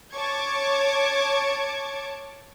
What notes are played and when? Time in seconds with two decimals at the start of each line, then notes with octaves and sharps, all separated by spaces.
0.14 C#5 A5 C#6 D6 G#6